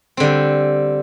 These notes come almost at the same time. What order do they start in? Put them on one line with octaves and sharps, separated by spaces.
C4 D3 G3